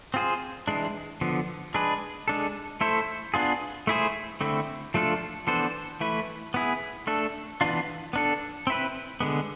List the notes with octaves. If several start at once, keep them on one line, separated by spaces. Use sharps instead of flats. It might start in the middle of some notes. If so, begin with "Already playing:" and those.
C4 F4 G#4 C5
E3 G#3 D4
D3 F3 B3
G#3 D4 G#4 B4
G#3 D4 A4
A3 E4 A4 C5
B3 D4 F4 G#4
A3 E4 G#4 C5
D3 A3 C4 E4
F3 A3 D4 F4 A4
E3 B3 D4 A4 C5
E3 A3 E4 B4
B3 E4 G#4
A3 D4 A4
E3 B3 D4 F4
B3 D4 A4
C4 E4 B4
D3 G#3 B3